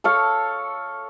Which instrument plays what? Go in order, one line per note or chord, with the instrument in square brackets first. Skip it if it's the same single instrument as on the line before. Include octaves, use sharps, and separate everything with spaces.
[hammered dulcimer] A4 C#5 F5